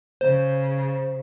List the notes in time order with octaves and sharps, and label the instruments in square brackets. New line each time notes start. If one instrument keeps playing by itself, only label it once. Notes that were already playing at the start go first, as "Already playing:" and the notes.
[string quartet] C#3 [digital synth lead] C5